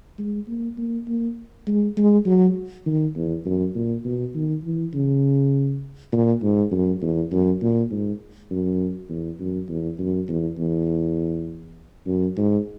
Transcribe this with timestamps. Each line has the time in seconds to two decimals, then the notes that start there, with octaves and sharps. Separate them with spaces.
0.19 G#3
0.48 A#3
0.78 A#3
1.08 A#3
1.67 G#3
1.97 G#3
2.26 F#3
2.86 D#3
3.16 E2
3.45 F#2
3.75 A#2
4.05 B2
4.35 D#3
4.64 E3
4.94 C#3
6.12 A#2
6.43 G#2
6.72 F#2
7.02 E2
7.32 F#2
7.62 A#2
7.91 G#2
8.51 F#2
9.09 E2
9.40 F#2
9.69 E2
9.99 F#2
10.29 E2
10.58 E2
12.06 F#2
12.37 G#2